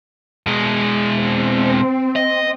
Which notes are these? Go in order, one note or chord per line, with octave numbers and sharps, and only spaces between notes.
B2 G#3
C4
D#5